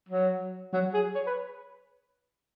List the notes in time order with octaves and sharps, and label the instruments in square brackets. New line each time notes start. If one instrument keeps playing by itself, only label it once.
[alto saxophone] F#3
F#3
G#4
C#5
B4